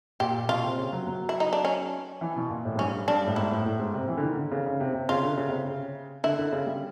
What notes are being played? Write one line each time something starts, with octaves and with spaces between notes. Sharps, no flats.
A#2 G4
B2 F4
C3
C#3
F#3
F#3
E4
D#4
D4
C#4
E3
B2
A#2
A2
G#2
G2 C#4
G2 D4
A2
G#2 E4
A2
A2
G#2
C3
E3
D3
D#3
D3
C#3
C#3
C3
C3
C#3 F4
D3
C#3
C3
C#3
D3 E4
D3
C#3
G3